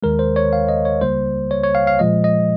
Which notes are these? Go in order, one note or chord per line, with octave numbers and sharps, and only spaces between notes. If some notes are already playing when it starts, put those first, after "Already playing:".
D#2 D#3 G#3 A#4
C5
C#5
F5
D#5
C#5
C#2 C#3 G3 A#3 C5
C#5
C#5
F5
F5
A#2 F3 G#3 D#5
D#5